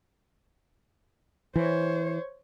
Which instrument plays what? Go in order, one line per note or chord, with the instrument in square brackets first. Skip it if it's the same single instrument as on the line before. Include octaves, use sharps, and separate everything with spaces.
[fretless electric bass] E3 [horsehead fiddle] C5 C#5